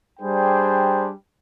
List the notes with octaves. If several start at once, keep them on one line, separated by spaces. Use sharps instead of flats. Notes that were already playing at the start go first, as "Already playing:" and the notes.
G3 D4 G#4 C5 G5